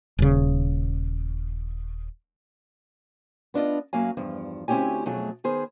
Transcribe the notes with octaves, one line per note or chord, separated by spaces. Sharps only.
D#1 C#3
B3 D4 F4 D#5
F#2 F#3 A#3 F5 G#5
E2 G2 F3
D2 C4 C#4 E4 G4 G#5
F2 B2 F#3 A3 G#4
D#3 B3 G#4 C5